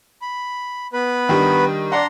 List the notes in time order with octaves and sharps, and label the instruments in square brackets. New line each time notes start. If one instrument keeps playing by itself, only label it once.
[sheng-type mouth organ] B5
B3 B4 B5
[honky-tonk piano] D#3 G3 D4
[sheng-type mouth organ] D4 A#5 C6 [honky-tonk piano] D5 F#5